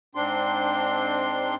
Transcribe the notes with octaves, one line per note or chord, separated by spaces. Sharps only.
G#2 C4 D4 C6